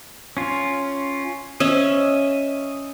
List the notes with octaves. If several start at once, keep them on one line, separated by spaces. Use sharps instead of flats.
C#4 F4
C#4 D#5 E5